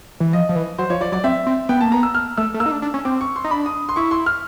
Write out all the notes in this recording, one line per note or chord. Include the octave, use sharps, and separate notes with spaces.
E3
F3 D#5
F3
E3
F#3 C5
F3 C#5
F3 D5
F#3 D5
C4 E5
C4
B3 G5
A#3 A5
B3 A#5
E6
F6
A3 E6
A3
A#3 E6
D#4
D4
D4
C#4
C4 D6
C#6
C6
D#4
D4 B5
D#6
C6
E4 C#6
C6
F6